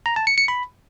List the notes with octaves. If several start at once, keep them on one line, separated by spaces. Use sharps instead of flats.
A#5
A5
C#7
C#7
B5